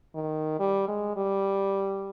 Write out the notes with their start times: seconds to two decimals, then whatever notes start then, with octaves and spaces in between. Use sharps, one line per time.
0.15 D#3
0.59 G3
0.88 G#3
1.17 G3